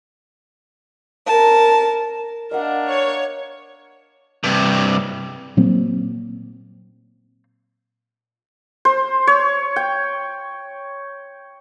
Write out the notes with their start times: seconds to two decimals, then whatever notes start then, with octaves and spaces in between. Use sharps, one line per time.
1.28 A#4 A5
2.51 D4 A#4 D#5 F5 F#5
2.88 C#5
4.44 G2 C3
5.57 A#2 F#3 A#3 C4
8.85 C5
9.27 C#5
9.76 G5